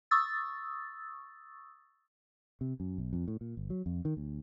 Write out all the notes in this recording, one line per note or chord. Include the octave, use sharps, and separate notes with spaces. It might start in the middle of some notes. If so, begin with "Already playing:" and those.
C#6 D#6 E6 A6
C3
F#2
B1
F2
A2
A#2
G1
F#3
F2
D#3
D2